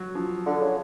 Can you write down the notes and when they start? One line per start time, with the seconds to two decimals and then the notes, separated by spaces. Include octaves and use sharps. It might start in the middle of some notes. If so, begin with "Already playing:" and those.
Already playing: F#3
0.15 F3
0.46 D3
0.61 C#3